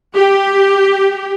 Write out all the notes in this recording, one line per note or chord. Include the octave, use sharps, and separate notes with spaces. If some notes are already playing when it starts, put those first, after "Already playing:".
G4